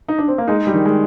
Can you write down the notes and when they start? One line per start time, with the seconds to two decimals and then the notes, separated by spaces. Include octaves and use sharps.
0.08 D#4
0.18 D4
0.28 C4
0.38 A#3
0.48 G#3 D#4
0.67 G3
0.74 D#3
0.85 G#3